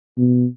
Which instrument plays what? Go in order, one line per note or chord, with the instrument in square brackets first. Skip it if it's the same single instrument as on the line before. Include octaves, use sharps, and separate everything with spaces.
[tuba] B2